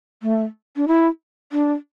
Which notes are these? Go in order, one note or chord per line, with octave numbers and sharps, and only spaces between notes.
A3
D4
E4
D4